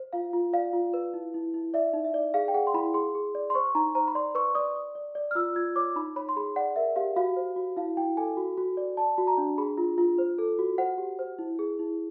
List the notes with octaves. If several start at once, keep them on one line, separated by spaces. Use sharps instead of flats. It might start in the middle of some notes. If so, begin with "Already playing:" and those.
Already playing: C5
F4 F5
F4
D5 F5
F4
B4
E4
E4
E4
D5 E5
D#4
E5
D5
G#4 F5
G5
G#4 F#5
C6
E4 B5
G#4 C6
G#4
D5
C6
C5 C#6
D#4 A#5
C5 A#5
B5
D5 C6
B4 C#6
D5 D#6
D5
D5
D5
F6
F4 E6
F4 G#6
C#5 D6
D#4 B5
C#5 B5
C6
G#4 B5
D5 F#5
A#4 E5
G4 F5
F#4 F5
C5
F#4
E4 F5
E4 G5
A4 G#5
F#4
F#4
D5
D5 A5
F#4
A#5
D4
G#4 B5
F4
F4
C5
A4
F#4
C5 F#5
G4
C5
E4
G#4
E4